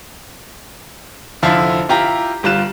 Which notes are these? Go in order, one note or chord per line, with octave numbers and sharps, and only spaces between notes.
F1 D3 F3 E4 F5 A5
E4 F4 G4 G5 A#5
G1 G3 F4 F#6 E7